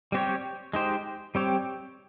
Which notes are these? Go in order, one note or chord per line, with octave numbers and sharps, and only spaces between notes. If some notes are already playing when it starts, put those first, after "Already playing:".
G3 C4 G4 C#5
G#3 D#4 G4 C5
G3 C4 G4 C#5